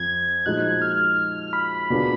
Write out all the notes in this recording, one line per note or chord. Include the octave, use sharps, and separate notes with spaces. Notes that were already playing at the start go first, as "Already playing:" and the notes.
Already playing: F2 F3 G#6
A#2 F3 G#3 D#4 F#4 F#6
G#6
F6
B5
B2 A#3 D4 F4 G#4